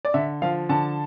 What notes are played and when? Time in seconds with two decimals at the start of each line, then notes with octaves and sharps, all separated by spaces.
0.05 D5
0.14 D3 E5
0.42 F3 F5
0.69 D3 A5